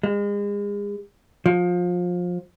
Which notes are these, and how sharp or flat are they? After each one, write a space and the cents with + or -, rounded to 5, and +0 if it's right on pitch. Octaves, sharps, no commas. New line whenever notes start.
G#3 -35
F3 +25